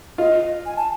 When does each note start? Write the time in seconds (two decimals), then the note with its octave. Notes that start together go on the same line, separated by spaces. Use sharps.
0.18 F4 D#5
0.66 G#5
0.77 A5